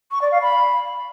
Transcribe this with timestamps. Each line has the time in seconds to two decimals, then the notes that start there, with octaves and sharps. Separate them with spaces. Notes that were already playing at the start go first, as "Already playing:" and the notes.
0.11 C#6
0.22 D5
0.32 F5
0.42 B5